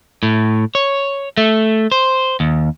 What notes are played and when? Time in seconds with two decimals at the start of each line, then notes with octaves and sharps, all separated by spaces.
0.23 A2
0.75 C#5
1.37 A3
1.92 C5
2.40 D#2